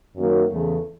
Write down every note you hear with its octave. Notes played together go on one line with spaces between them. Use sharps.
F#2 D#3 F#3 A#3
E2 C#3 E3 A3